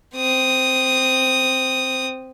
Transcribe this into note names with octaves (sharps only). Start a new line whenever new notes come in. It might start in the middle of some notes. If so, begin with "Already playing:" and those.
C4 D#6